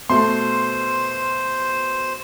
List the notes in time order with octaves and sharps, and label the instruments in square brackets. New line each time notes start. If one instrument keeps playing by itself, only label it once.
[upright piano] B2 A3 [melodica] C5 [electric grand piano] C6